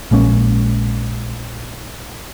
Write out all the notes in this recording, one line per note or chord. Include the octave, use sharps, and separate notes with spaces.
A#1 G#3 A#3 C#4